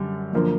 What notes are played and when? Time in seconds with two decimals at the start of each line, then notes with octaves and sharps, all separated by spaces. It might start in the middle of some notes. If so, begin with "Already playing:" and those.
Already playing: F#2 D3 G3
0.33 F#2 D3 F3 A#3